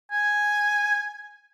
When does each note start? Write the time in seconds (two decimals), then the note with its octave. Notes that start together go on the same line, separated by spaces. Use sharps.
0.12 G#5